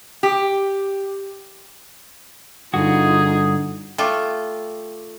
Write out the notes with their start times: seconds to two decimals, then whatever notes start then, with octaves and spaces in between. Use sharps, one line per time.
0.23 G4
2.74 G2 D3 D#4 F4 F#4 G#4
3.98 A3 F4 G5 D6